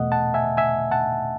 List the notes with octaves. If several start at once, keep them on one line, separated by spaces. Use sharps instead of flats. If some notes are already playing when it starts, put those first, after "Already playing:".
Already playing: E2 B2 A3 D#5 F#5
F#5 A5
E5 G#5
E5 G#5
F#5 A5